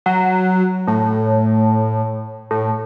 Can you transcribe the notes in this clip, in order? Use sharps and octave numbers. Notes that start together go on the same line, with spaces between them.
F#3
A2
A2